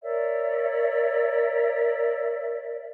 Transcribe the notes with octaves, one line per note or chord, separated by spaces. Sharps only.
A#4 C#5 D5 E5